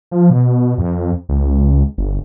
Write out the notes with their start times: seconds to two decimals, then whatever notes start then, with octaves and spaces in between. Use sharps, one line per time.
0.11 F3
0.30 B2
0.78 F2
1.29 C#2
1.98 G1